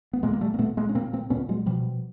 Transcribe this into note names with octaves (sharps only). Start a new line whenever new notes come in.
B3
A#2 G#3 A#3
A#3
G3 A3
A#3
A#2 A3 B3
G#3 A#3
C#4
A#2 A#3 C4
A#3 C4
A#2 B3 C#4
F#3 G#3
B2 F3 G3